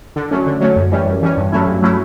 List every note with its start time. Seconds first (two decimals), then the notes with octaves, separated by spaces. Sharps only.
0.16 D3
0.31 F#3 A3 C#4
0.46 D3
0.61 F#3 A3 C#4
0.76 F#2
0.92 E3 G3 C#4
1.07 F#2
1.22 E3 G3 C#4
1.37 G2
1.52 F#3 A3 C#4 E4
1.67 G2
1.82 F#3 A3 C#4 E4